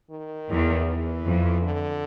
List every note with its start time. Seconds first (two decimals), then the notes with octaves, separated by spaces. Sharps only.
0.11 D#3
0.49 E2
0.86 E3
1.24 F2
1.62 D3